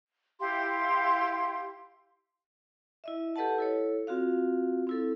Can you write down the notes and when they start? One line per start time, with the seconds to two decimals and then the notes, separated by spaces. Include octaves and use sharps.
0.40 E4 G4 F5 C6
3.04 E4 D#5 E5
3.36 G4 A4 B4 D#5 F#5 A5
3.58 E4 A4 C#5
4.07 C4 F4 F#4 F5
4.87 C4 E4 A4